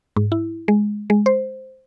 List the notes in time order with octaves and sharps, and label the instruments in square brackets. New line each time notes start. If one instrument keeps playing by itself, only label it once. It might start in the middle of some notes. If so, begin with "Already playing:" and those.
[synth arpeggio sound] G#2
E4
G#3
G#3
C5